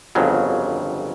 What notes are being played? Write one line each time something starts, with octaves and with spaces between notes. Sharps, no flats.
G1 F2 C#3 F#3